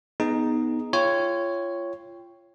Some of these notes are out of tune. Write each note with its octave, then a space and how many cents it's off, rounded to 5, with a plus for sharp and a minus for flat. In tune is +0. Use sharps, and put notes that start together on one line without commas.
B3 +0 D#4 +0 G#4 +0
F4 -25 C#5 +0 G5 +5